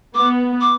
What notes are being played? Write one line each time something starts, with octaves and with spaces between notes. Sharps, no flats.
B3 D6
D6